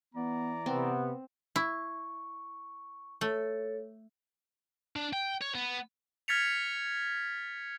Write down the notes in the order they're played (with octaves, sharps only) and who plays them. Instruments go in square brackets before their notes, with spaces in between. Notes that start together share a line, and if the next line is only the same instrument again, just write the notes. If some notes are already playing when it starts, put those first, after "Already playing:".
[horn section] E3 D5 A#5 [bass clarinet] B3
[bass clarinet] C3 [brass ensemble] B3 [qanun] C4
[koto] E4 [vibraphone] C#6
[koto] A3 [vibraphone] A4 C#5
[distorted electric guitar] D4
G5
C#5
B3
[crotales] F6 G#6 A6 B6 C#7 F7